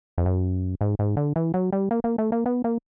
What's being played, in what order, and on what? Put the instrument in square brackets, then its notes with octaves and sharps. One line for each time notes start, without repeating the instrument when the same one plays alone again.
[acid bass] F2
F#2
G#2
G#2
D3
E3
F#3
G3
A#3
A#3
A3
A#3
B3
A#3